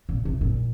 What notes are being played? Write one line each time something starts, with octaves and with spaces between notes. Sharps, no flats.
A#2
C3
A#2